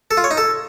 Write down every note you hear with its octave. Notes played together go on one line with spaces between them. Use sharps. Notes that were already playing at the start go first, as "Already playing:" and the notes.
A4
F4
C#5
D#4
A4